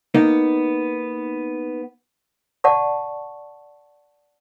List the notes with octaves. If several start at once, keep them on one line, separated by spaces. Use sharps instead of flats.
A#3 B3 D#4
D5 F#5 A5 C#6